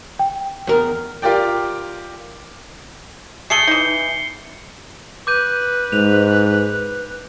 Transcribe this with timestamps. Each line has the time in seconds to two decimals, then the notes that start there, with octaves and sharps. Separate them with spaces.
0.19 G5
0.67 E2 A#4
1.22 F4 G4 A#4 D5 G5
3.50 A3 G#4 A4 C7 C#7 G7
3.67 E3 D#4
5.27 B4 D6 G6 D#7
5.92 G#2 F7